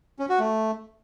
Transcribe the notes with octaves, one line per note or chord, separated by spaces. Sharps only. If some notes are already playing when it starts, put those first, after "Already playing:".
C#4
F#4
A3